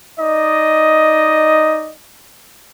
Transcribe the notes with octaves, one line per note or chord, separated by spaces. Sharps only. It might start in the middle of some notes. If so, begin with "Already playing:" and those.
D#4 D5 D#5